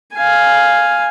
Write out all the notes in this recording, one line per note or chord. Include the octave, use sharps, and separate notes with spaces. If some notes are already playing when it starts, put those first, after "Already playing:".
F5 G#5